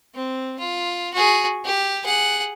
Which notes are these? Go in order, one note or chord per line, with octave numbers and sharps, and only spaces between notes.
C4
F4
F#4 G#4
G4
G#4 F#5